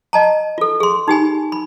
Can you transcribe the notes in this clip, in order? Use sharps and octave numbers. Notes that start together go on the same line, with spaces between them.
D#5 A5 A#5
F4 A4
G#4 C6
D#4 G4 G#5 B5
B5